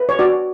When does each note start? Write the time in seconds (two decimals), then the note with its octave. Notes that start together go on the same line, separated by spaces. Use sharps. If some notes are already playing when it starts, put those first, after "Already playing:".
Already playing: B4
0.09 C#5
0.19 F#4 D5